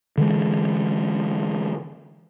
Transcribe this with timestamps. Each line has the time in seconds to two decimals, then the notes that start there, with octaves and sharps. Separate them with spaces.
0.18 D3 E3 G#3